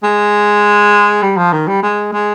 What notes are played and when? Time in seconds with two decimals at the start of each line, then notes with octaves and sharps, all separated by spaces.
0.04 G#3
1.22 G3
1.37 F3
1.53 D#3
1.68 G3
1.83 G#3
2.13 G#3